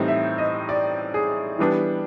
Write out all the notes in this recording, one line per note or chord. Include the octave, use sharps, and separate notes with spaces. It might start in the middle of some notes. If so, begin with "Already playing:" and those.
Already playing: A2 E3 G3 C4 D#4
E5
D#5
D5
G#4
E3 G3 B3 D4